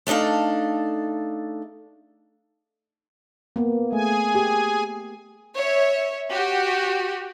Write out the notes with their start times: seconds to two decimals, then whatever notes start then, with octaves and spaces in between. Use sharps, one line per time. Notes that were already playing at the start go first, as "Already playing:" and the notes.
0.07 A3 D4 D#4 A4 F5
3.56 A#3 B3
3.92 A3 G#4 G#5
4.35 G4
5.55 C#5 E5
6.29 F#4 G4